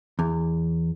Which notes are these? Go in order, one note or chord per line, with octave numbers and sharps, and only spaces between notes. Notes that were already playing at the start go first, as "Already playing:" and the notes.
E2